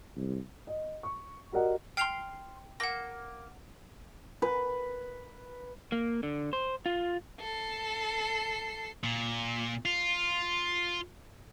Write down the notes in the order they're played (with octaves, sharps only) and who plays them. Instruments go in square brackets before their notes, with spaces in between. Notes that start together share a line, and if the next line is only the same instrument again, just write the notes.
[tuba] C2
[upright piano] D#5
C#6
F#4 G4 A#4 D5 D#5 F#5
[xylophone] G5 C7 F7 [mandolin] C6 F6
[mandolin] A#3 E6 [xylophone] F#5 A#6
[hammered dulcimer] B4
[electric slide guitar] A#3
D3
C5
F4
[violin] A4 C7
[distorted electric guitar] A#2
F4